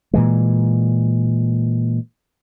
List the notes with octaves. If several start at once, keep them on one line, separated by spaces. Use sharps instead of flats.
A#2 E3 G#3